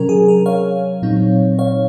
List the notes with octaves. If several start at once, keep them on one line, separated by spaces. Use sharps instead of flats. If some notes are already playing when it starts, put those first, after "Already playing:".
Already playing: C3 F#3 C#4 A#4
G#4
A#4
C#5 F5
A#2 F#3 C4 D#4
C#5 F5